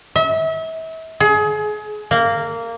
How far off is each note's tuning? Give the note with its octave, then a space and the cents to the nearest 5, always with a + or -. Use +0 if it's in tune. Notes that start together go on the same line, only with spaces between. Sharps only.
E5 -35
G#4 +30
A#3 -15